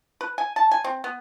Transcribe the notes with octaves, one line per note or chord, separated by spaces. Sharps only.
B4
G#5
A5
G#5
C4
B3